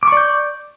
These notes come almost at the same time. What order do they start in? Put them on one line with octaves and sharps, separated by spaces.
D6 C#6 D5 G6